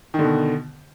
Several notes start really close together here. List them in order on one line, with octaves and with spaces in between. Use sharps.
D#3 D3 B2